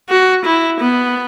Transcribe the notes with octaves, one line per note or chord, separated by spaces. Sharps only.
F#4
E4
B3